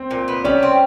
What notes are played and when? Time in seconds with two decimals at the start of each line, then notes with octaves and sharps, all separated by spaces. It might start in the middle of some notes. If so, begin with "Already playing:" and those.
Already playing: C4
0.11 A#2
0.28 B3
0.44 G3 C#4
0.63 C4